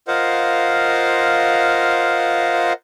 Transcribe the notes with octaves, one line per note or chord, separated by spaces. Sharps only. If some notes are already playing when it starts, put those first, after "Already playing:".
F4 A#4 C5 D#5 F5 F#5